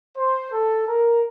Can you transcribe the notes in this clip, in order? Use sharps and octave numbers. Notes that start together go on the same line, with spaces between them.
C5
A4
A#4